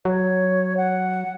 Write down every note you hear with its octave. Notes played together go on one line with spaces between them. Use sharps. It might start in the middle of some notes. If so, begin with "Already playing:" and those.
F#3 C#5
F#5